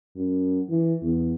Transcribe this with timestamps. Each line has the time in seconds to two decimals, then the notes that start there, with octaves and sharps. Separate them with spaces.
0.16 F#2
0.69 E3
1.03 E2